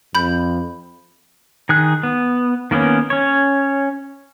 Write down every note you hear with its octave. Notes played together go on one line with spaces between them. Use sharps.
F2 B5 G6
D#3 G#4 F#6
B3
D#3 A#3 B3 C#4
C#4 C#5